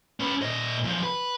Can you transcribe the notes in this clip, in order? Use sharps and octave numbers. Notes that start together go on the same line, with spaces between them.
C#4 B4
A#2 D#5
E2 F3
B4